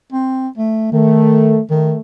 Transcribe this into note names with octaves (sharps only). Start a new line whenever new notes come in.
C4
A3
D#3 A3
D#3 A3